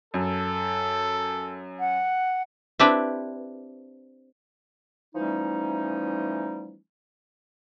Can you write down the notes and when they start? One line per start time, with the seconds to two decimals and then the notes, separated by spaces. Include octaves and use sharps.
0.14 F#2 A4
1.80 F#5
2.79 C4 D4 E4 G4 B4
5.15 E3 F3 G3 A3 C#4 D#4